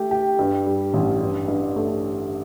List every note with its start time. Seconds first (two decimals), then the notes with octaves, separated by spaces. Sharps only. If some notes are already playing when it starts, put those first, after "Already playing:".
Already playing: A3 G4
0.11 G4
0.39 G2
0.66 G3
0.94 A1
1.21 G2
1.48 G2
1.76 A3